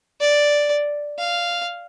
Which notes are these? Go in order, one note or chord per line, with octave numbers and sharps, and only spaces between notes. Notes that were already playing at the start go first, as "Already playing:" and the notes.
D5
F5